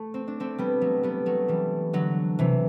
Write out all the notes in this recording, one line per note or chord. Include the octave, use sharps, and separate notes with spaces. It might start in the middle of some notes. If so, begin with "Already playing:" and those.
Already playing: A3
C4
D4
A3 C4
G3 B3
F#3 A3
G3 B3
F#3 A3
E3 G3
D3 F#3
C3 E3